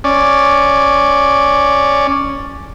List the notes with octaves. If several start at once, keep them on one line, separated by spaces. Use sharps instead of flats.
C#4 D5